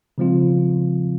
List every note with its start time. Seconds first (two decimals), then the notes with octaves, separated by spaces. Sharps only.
0.18 C#3 F3 G#3 C4 F4